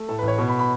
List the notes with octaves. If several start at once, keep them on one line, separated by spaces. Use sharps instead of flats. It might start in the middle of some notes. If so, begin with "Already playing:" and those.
Already playing: A3
A2 A4
B4
A1
C#5
B2
B5
B5